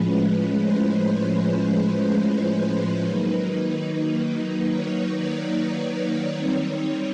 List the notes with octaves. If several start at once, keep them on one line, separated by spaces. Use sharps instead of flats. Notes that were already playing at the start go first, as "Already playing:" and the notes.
Already playing: A2 F3 G#3 C#4 B4
B4
C5
D#3 F#3 A#3 D#4 B4
C#5
D5
C#5
D#3 G3 C4 D#4